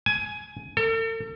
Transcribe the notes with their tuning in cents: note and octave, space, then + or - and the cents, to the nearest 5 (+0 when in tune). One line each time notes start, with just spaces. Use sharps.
G#5 +15
A4 +45